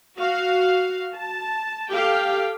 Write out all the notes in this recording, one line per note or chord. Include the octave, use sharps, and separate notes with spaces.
F#4 F5
A5
G4 A4 F5 G5